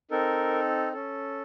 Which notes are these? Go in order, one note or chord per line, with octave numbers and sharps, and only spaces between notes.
C4 D#4 A4 A#4
C#4 A4